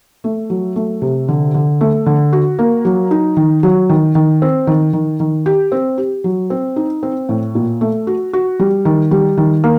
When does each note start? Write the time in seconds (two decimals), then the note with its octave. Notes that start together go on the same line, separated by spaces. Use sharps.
0.24 A3
0.50 F#3
0.76 A3
1.02 C3
1.28 D3
1.54 D3
1.81 A3
2.06 D3
2.33 F#4
2.59 A#3
2.85 F#3
3.11 D#4
3.37 D#3
3.63 F#3
3.89 D#3
4.15 D#3
4.42 C4
4.67 D#3
4.93 D#3
5.20 D#3
5.46 G4
5.72 C4
5.98 G4
6.24 F#3
6.50 C4
6.76 D#4
7.03 C4
7.29 A2
7.55 A#2
7.81 A3
8.07 F#4
8.33 F#4
8.60 G3
8.85 D#3
9.11 G3
9.37 D#3
9.64 A#3